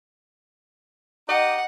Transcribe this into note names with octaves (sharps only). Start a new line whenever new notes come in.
D#4 G4 D#5 F#5